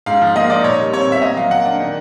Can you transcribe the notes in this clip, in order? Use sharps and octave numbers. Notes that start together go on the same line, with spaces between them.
G#2 F5
F3
A#3 D#5
D#4 D5
A#2 C#5
G3
C4 C#5
A#2 E5
A#2 D#5
F#3 F5
A#3 F#5
D4
D#3